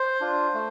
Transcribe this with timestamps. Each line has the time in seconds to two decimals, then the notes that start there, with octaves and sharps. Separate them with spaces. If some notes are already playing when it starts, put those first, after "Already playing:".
Already playing: C5
0.21 D4 F4
0.54 A3